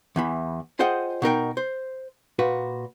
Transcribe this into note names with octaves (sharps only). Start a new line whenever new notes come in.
E2 E3 B5
F4 G#4 C5 D#5 F#5 G5
B2 D#4 A#4 G5
C5
A#2 F#4 B4